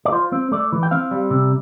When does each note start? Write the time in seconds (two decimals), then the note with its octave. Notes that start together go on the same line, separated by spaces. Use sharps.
0.05 D5
0.12 F4 C5
0.32 C4
0.51 A3 D5
0.72 E3
0.83 G5
0.91 C4 F5
1.11 G3
1.30 C3